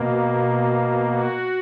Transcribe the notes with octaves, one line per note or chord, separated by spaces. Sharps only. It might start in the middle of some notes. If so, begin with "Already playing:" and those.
Already playing: B2 A#3
F#4